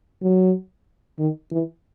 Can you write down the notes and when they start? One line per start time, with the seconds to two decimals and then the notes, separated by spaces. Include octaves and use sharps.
0.22 F#3
1.19 D#3
1.51 E3